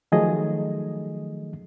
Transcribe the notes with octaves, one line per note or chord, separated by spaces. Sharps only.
D#3 F3 F#3 A3 G#4 D#5